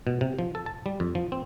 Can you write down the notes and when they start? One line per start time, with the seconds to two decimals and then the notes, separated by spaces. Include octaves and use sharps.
0.07 B2
0.21 C3
0.39 F3
0.55 A4
0.66 A5
0.86 G3
1.00 F2
1.15 F3
1.32 C4